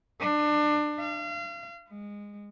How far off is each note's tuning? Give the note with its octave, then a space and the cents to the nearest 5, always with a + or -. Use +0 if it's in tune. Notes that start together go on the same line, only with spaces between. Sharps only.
D4 +25
F5 -35
G#3 -20